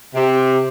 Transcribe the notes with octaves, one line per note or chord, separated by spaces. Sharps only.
C3